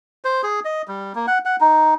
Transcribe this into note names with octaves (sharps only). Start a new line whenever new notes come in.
C5
G#4
D#5
G3
A#3
F#5
F#5
D#4